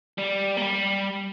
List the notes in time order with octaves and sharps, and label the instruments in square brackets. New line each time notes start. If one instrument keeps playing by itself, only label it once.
[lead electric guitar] G3
A#3
G3